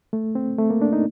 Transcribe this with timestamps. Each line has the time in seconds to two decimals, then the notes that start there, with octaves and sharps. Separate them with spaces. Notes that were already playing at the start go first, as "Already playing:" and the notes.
0.13 A3
0.35 C4
0.58 A3
0.70 A#3
0.82 D4
0.93 D#4